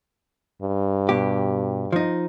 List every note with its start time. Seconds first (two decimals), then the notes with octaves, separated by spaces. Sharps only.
0.62 G2
1.09 B2 G4
1.93 F3 D#4